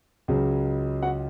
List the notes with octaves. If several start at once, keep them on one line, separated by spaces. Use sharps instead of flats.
C#2 C#3 F#3
F#4 F#5